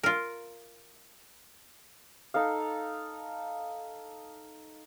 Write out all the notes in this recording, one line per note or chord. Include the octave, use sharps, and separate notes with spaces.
F4 A#4
D#4 A4 F5